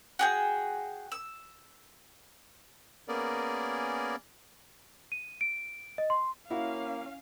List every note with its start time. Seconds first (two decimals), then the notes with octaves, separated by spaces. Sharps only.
0.19 F#4 G#4 G5
1.12 E6
3.08 A#3 B3 C#4 G#4 A#4 D5
5.12 D#7
5.41 D7
5.98 D#5
6.10 C6
6.50 A#3 C#4 E4 F#4 F5